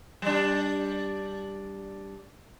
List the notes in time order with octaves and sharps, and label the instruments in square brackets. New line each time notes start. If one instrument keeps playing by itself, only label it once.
[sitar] G3 D4